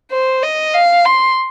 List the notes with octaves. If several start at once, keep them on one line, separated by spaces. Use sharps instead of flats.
C5
D#5
F5
C6